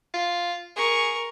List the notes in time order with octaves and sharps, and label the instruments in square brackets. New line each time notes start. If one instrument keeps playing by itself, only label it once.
[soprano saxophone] F4
[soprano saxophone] G#4 [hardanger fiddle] A#4 C#6